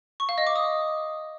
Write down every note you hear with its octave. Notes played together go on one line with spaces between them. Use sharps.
C#6
F5
D#5
D6
D#6